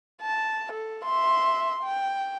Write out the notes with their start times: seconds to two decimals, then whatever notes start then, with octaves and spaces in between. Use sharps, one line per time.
0.21 A5
0.72 A4
1.05 E5 C6
1.83 G5